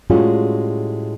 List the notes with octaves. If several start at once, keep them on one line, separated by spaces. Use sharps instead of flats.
A2 G3 G#3 C#4 F4 F#4